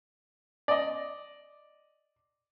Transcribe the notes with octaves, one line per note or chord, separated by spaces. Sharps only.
D5 D#5